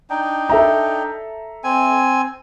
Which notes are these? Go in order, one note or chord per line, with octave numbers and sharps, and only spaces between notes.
D4 D#4 G5
A4 E5 A#5
C4 G#5